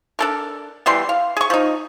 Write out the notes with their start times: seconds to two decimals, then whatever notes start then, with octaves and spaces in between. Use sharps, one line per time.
0.19 D4 A4 A#4
0.86 B2 E3 G3 C6
1.09 F5
1.37 G#4 C#6
1.50 F3 D#4